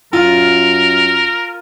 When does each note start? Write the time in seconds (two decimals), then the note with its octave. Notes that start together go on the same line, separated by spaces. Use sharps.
0.13 F#2 F4 A#4